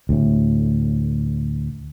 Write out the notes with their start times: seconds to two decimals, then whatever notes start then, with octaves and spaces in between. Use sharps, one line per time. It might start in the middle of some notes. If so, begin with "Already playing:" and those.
0.09 D2 A2